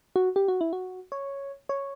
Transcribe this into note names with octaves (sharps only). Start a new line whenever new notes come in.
F#4
G4
F#4
E4
F#4
C#5
C#5